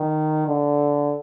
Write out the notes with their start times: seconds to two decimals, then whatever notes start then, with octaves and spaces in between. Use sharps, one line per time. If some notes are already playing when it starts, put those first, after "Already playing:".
Already playing: D#3
0.47 D3